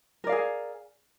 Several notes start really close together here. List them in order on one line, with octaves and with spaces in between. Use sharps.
A#4 D5 F5 G#4